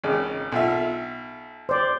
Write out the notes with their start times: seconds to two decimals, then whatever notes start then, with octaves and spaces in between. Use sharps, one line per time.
0.04 G#1 C#3
0.52 B1 F4 E5
1.69 C5 D5